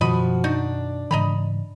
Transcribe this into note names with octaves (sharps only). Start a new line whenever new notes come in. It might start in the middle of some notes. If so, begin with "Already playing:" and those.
F#2 B2 D#3 F3 F#4 D#5 B5
D4 D#4 F#4
G#2 C#3 E3 D#5 A#5 B5